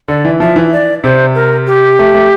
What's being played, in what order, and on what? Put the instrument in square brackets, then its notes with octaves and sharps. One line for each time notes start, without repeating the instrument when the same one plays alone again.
[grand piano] D3 [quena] D5
[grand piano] E3
[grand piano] F3 [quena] E5
[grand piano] E3
[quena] D5
[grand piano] C3 [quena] C5
[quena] A#4
G4
[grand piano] A3
A3